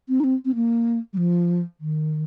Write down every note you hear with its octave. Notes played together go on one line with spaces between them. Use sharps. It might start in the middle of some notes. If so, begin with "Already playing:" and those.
C4
D#4
C4
C4
A#3
G3
F3
D#3